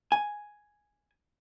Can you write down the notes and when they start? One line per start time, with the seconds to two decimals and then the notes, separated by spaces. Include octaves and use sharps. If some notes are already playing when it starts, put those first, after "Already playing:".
0.12 G#5